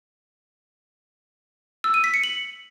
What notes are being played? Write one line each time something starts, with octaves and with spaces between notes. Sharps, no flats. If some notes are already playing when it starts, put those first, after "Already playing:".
E6
D#7
B6
C#7
F#7